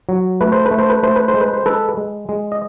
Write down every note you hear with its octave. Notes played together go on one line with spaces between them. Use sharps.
F#3
A3 B4
C5
B4
A3
C5
B4
A3 C5
B4
C5
G#3
B4
C5
G#3 A4 B4
G#3
G#3
D#5